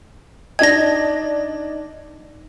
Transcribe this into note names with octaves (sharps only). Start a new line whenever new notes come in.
D4 D#4 D#5 G#6 A#6